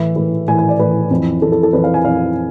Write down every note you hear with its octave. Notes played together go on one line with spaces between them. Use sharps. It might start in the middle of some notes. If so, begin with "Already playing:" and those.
Already playing: A2 E3 E5
A2 E3
A2 E3 G#5
G#5
D5
A2 E3 B4
F2 E3
F2 E3 A4
A4
A4
F2 E3 B4
F5
G#5
F2 E3 F5